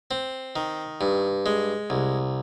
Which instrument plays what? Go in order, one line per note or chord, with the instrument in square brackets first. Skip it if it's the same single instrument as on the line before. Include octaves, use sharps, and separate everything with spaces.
[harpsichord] C4
D#3
G2
G#3
C2